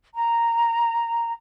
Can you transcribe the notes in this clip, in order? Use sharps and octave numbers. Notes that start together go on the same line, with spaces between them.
A#5